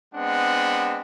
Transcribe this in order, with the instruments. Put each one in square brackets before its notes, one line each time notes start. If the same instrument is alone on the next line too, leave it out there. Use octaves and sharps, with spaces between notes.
[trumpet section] G#3 B3 C4 D4 F#5